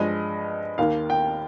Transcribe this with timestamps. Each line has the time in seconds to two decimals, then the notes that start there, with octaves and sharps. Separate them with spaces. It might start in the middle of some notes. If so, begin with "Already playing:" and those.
Already playing: G2 F3 G#3 D#5
0.78 D#2 D#3 A#3 F5
1.10 G5